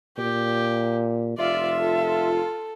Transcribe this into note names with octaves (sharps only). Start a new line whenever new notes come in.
A#2 G4
F1 F4 D5 E5
A4